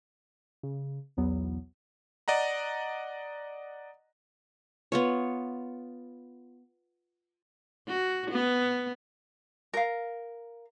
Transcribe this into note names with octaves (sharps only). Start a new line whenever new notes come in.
C#3
B1 E2 F#3 B3
D5 D#5 F#5 A#5
B3 F4 C#5
F#4
B3
A#4 F5